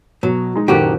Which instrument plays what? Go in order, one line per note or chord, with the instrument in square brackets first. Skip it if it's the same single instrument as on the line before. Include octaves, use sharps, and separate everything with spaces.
[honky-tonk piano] B2 [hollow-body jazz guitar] F#3
[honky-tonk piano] G#3 D#4
[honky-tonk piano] F#1 D#3 A4 [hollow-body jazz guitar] A#2 F#4 G4